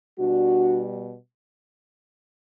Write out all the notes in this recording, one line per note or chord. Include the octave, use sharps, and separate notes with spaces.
B2 G3 D4 F#4